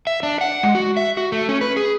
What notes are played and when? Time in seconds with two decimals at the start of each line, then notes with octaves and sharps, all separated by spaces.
0.07 E5
0.23 D4
0.41 F#5
0.63 G#3
0.75 F#4
0.97 E5
1.17 F#4
1.32 A3
1.49 C#4
1.61 B4
1.77 G#4